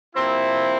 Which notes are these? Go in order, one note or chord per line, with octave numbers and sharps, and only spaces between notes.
C3 F3 A#3 C4 E4